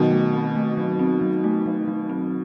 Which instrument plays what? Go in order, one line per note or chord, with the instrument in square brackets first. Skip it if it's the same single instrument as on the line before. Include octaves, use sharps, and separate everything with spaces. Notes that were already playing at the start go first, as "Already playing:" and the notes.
Already playing: [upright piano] B2 D#3 [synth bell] F#3
[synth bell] A3
C4
A3
F#3
C4
F#3
A3
F#3
F#3
C4